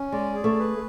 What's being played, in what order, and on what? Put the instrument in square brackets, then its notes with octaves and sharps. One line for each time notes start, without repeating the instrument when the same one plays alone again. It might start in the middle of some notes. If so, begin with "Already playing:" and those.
Already playing: [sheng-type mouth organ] C#4
[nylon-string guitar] G#3 [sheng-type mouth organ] D5
[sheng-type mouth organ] G#4
[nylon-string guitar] A3
[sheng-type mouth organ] B4